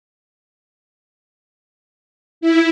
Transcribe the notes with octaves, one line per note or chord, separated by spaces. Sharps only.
E4